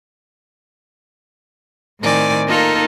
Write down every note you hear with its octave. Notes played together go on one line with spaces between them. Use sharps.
A2 D#3 C4 D5 G#5
A#3 D#4 F4 A4 A#4